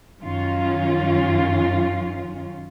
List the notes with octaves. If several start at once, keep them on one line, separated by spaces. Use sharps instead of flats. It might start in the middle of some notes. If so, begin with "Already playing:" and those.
F#2 D#3 F#3 C#4 F4